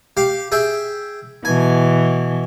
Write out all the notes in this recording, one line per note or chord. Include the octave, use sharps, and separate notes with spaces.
G4 F5
G#4 E5 G5
B2 E3 G#5